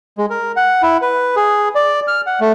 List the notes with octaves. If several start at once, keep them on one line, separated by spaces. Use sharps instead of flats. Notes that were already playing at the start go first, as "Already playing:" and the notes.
G#3
A#4
F#5
E4
B4
G#4
D5
F6
F#5
A3